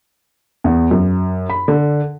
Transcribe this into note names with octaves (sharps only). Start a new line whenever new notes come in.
E2
F#2
B5
D3